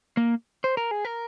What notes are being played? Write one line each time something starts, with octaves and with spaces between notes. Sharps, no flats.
A#3
C5
A#4
G#4
A#4